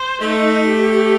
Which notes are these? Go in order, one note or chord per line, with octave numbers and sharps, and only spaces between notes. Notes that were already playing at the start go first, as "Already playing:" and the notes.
Already playing: C5
A3 D#4
G4